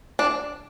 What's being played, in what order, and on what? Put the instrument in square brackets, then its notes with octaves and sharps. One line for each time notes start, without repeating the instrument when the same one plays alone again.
[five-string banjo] D4